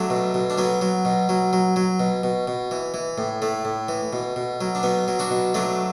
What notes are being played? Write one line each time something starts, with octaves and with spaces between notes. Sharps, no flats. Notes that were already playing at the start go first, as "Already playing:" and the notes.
Already playing: F#3 A3 D4
B2
B2
D4
F#3 B3
F#3
B2
F#3
F#3
F#3
B2
B2
B2
E3
E3
A2
A2 A3
A2
E3
B2
B2
F#3
D4
B2 B3
F#3
D4 F#4
B2
F#3 A3 D4